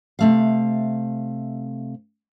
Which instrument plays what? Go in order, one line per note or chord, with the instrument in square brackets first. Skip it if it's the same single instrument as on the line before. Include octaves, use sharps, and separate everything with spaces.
[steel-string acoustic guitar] C3 A3 F5